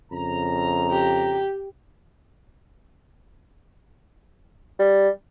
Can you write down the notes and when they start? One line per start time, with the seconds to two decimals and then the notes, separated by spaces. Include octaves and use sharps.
0.12 F2 C#3 A#5
0.92 G4
4.79 G3